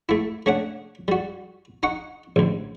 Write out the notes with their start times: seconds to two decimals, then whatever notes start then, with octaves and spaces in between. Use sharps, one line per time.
0.09 A3 E4
0.46 A3 C#4 D4 F#5
1.08 G3 F#4
1.83 D#4 F#5 C#6
2.36 A1 D2